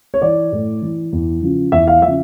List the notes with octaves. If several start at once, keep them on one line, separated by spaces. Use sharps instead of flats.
C#5
E3 D5
A2
E3
E2
C#3 F3
E2 E5
F5
C#3 F3 E5